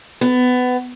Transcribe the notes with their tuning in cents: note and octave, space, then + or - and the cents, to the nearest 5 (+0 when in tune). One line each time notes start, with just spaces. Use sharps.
B3 +20